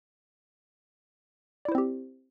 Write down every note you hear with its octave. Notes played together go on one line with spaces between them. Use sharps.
C4 E4 G4 C5 D5